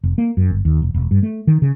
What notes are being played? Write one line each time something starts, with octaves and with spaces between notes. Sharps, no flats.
F1
A#3
F#2
G1
D#2
E1
E1
G2
A3
D#3
C#3